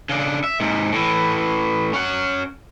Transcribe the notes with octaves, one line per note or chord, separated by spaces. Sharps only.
C#3 D4
E5
G#2 C3
A2 E3
C#4 F#5